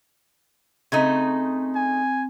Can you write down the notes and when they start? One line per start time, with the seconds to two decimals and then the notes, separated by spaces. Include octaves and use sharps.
0.92 C#3 A3 C4 D#4
1.75 G#5